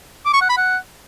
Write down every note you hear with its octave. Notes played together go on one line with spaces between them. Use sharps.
D6
C#6
F#5
B5
F#5